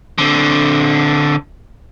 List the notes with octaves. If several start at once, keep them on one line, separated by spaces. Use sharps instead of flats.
D3 C4